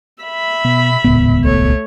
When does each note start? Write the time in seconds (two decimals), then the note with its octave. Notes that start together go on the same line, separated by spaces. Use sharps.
0.23 E5 B5
0.65 B2 B3
1.04 D#1 C#2 A2 B3
1.44 C2 A3 C#5